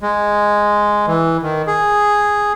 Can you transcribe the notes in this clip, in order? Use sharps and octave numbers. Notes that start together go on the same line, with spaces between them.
G#3
E3
D#3
G#4